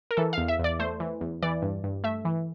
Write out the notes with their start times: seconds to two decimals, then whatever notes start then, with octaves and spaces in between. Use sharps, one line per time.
0.11 A#4
0.17 E3 A4
0.33 F5
0.38 E2
0.48 E5
0.59 E2
0.64 D5
0.79 A3 C5
1.00 E3
1.21 E2
1.43 E3 D5
1.62 G2
1.84 G2
2.04 A3 E5
2.25 E3